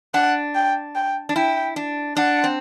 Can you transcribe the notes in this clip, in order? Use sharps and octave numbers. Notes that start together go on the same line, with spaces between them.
D4 F#5
G5
G5
D4
E4 G5
D4
D4 F#5
C4